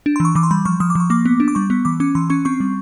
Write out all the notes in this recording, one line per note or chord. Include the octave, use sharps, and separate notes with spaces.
D4
C6
E3 C#6
E3 D6
C6
G3 B5
F3 C#6
F3 D#6
D6
F3 C#6
A#3 D6
B3
D4
D6
G3 C#6
B3
E3 D6
C#4 D6
E3 C6
C#4 C#6
C4 C#6
G3